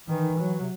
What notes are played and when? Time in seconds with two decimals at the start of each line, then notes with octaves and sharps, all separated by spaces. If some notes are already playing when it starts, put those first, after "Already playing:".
0.08 D#3 E3
0.39 F#3
0.61 C3